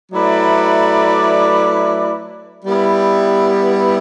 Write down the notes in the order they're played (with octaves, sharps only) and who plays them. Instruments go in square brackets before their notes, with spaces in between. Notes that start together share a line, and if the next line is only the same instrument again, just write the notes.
[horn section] F#3 A3 E4 B4 D5
G3 B3 E4